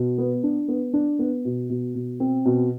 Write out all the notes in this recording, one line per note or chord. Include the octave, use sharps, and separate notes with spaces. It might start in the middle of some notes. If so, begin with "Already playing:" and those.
Already playing: B2
B3
D4
B3
D4
B3
B2
B2
B2
C4
B2